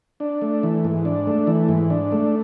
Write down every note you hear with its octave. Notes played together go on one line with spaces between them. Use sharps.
D4
A3
E3
G#2
D4
A3
E3
G#2
D4
A3